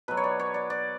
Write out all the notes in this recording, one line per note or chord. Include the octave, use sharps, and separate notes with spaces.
B2 F#3 B4
C#5
D5
C#5
D5
D5